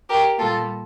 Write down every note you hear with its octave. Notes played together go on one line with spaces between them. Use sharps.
G4 A#4
A#2 G3 A#3 F4 A4